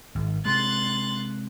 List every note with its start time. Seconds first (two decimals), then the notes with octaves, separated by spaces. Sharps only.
0.15 G#1
0.45 C3 G#3 C6 F#6 A6